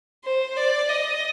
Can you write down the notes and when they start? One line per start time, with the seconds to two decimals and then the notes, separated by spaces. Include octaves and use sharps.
0.24 C5
0.57 D5
0.89 D#5